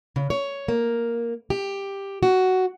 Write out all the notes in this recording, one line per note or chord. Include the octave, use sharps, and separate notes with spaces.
C#3
C#5
A#3
G4
F#4